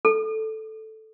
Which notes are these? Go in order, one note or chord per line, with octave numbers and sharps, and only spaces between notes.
A4